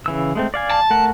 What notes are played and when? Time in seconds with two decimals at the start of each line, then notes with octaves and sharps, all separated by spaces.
0.06 C#3 E3 E6
0.35 G#3 A3 C4
0.54 D5 F5 G#5
0.70 A5
0.90 A3 A#4 F#5